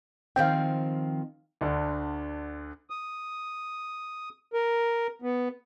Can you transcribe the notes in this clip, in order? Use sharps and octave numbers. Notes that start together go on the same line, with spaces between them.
D#3 F3 C4 F5 G5
D2 D3
D#6
A#4
B3